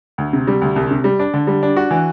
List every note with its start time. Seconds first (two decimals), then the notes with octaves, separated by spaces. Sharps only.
0.18 D2
0.33 C3
0.47 G3
0.62 D2
0.76 C2
0.91 C3
1.04 G3
1.19 D4
1.34 D3
1.47 G3
1.63 D4
1.76 F#4
1.91 E3